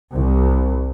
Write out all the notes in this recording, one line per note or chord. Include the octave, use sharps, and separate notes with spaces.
C2